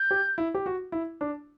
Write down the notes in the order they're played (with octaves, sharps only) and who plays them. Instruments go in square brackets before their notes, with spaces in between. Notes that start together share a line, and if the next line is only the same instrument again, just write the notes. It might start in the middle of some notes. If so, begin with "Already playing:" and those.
Already playing: [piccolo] G6
[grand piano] G4
E4
G4
F#4
E4
D4